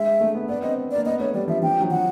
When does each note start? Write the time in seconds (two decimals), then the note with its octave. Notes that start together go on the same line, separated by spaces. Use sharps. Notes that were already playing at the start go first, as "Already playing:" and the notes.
Already playing: G#3 E5
0.21 A3
0.34 B3
0.49 B3 D5
0.62 C4 D#5
0.91 A#3 D5
1.06 B3 D#5
1.19 A3 C#5
1.34 G3 D5
1.48 F3 E5
1.62 F3 G5
1.80 F#3
1.91 F3 F#5